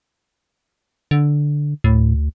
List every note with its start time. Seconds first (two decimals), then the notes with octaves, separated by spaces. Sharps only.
1.11 D3
1.84 D2 A2